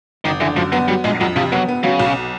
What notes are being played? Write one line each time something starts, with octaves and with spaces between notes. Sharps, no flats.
F#1 D#3
D3 E3
F#2 F3
F#3 B3
F#3 G3
A#1 G#3
F2 F#3
C3 F3
F#3 B3
B3
C#3 F#3
B1